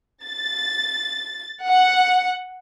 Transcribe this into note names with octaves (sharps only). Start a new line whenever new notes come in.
A6
F#5